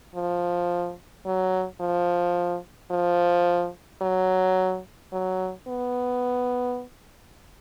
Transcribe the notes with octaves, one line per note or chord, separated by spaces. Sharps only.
F3
F#3
F3
F3
F#3
F#3
B3